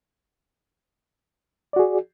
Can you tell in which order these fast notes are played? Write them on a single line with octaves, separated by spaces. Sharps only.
D5 F#4 G#4